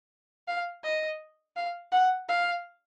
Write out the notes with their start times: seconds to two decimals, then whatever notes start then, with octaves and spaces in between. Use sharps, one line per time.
0.48 F5
0.84 D#5
1.56 F5
1.92 F#5
2.29 F5